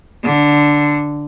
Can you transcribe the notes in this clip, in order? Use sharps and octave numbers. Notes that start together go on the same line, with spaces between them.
D3